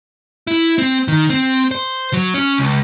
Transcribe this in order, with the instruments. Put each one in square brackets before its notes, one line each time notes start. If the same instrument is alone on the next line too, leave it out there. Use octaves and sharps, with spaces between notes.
[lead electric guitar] E4
C4
D#3
C4
C5
F#3
C#4
C#2